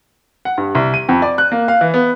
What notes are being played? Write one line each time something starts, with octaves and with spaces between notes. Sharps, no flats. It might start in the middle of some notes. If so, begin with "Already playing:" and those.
F#5
G2
C2
D#7
F2
D5
F#6
A#3
F5
E3
B3